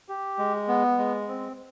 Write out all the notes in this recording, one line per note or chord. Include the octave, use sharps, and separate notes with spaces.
G4
G#3
B3
G#3
C4